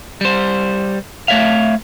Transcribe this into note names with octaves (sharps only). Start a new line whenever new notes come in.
G3 C5
A3 C#5 E5 F5